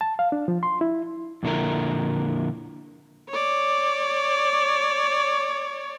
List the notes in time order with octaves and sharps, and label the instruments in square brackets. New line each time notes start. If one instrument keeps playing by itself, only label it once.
[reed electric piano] A5
F5
D4
F3
C6
E4
[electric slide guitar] F2 A#2 D3 E4 A#4
[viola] C#5 D5